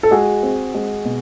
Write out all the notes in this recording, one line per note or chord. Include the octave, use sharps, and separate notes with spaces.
A4
G#3 F#4 G#4
C4
G#3
B2